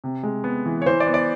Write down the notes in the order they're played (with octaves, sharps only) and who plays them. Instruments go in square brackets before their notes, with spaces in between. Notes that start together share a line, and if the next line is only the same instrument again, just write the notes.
[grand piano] C3
G#3
B3
E3
C#5
E3 C5
D5
B3
D5